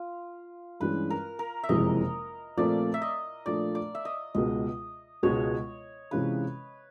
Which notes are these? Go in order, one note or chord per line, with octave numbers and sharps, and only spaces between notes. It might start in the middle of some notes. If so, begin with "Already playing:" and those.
Already playing: F4
G2 E3 G#3 C#4 B4
A#4
A#4
E5
F#1 F2 C3 E3 G#3 D#5
A#2 F3 A3 C4 D5
E5
D#5
A#2 F3 A3 D4 D5
D5
E5
D#5
C#2 B2 G#3 D#5
C#2 B2 G#3 B3 C#5
C3 E3 G#3 C#4 F4 B4